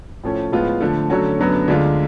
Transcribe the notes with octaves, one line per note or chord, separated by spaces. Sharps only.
A2 F3 A3 C#4
A2 F3 G#3 B3 F4
D3 F3 A3
D3 F#3 A3 C#4 F#4
F#2 D3 F#3 B3
D2 D3 G#3 D4 F4